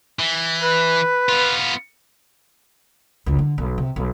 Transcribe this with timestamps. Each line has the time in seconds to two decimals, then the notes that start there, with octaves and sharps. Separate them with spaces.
0.19 E3
0.63 B4
1.29 B3 F4
3.26 F1 C#2
3.39 D3
3.58 B1
3.78 C3
3.96 B1